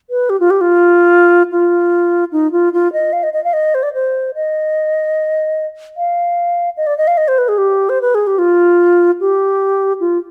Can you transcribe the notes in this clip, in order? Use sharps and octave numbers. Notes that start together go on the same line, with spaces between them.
B4
G4
F4
G4
F4
F4
D#4
F4
F4
D#5
F5
D#5
D#5
F5
D#5
C5
D5
C5
D#5
F5
D#5
D5
D#5
F5
D#5
C5
B4
G#4
G4
C5
B4
G#4
G4
F4
G4
F4